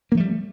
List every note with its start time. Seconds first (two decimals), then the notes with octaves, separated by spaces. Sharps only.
0.12 A#3
0.14 F3
0.17 A3
0.20 G3